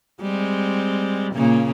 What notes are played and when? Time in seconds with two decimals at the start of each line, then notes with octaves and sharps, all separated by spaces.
0.21 G3 G#3 C4
1.33 A#2 C#3 A#3